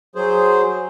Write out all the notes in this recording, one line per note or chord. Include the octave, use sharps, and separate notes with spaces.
F#3 G#4 C5